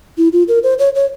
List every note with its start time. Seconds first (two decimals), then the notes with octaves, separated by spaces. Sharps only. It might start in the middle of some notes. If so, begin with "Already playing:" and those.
0.18 E4
0.33 F4
0.48 A#4
0.63 C5
0.79 C#5
0.95 C#5